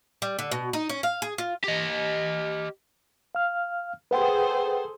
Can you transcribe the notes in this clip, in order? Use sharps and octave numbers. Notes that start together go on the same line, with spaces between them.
G3
D3
B2
D#4
C#4
F5
G#4
F4
G4 D#5
F5 F6
G#4 A4 B4 C5 F#5 G5